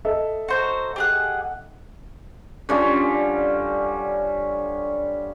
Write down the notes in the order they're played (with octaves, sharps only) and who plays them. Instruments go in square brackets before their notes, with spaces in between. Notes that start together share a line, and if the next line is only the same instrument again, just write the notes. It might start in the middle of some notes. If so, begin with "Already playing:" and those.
[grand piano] A4 D#5 E5
[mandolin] F#4 C5 A#5
G4 G#4 F#5
[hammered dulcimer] D3 G3 C#4 F4